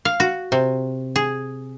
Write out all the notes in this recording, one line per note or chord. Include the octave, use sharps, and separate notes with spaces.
F5
F#4
C3
G#4